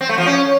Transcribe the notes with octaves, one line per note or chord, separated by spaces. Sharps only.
C4
A3
F3
C#4